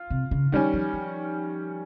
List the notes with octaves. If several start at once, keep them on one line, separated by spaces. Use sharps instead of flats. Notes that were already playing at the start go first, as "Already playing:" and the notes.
Already playing: F4
C3
C#3
D#3 F3 G3 C#4
F3
F3